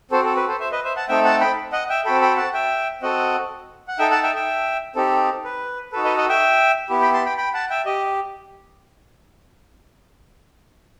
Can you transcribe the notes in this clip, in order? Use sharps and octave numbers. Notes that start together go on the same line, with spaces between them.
C4 F#4 A4 C5
A4
B4
A4 C5
C5 E5
B4 D#5
C5 E5
F#5 A5
A3 C4 D#4 A4 E5 G5
F#5 A5
G5 B5
D#5 F#5
E5 G5
C4 F#4 A4 G5 B5
G5 B5
F#5 A5
E5 G5
C4 F#4 A4 D#5 F#5
F#5
D#4 A4 E5 G5
F#5 A5
E5 G5
E5 G5
C4 D#4 G4 A4
B4
D#4 F#4 A4 B4
B4 D#5
D#5 F#5
E5 G5
B3 E4 G4
G5 B5
A5 C6
G5 B5
G5 B5
F#5 A5
E5 G5
G4 D#5